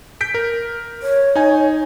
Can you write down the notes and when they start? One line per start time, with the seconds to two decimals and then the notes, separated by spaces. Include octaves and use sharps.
0.21 G6 B6 D7
0.34 A#4
1.03 C#5
1.35 D#4 G#5